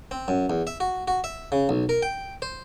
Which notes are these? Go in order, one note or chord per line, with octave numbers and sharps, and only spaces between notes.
C4
F#2
E2
E5
F#4
F#4
E5
C#3
B1
A#4
G5
C5